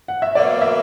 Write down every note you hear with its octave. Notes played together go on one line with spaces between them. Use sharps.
F#5
E5
B2 F#3 A#3 D5
E5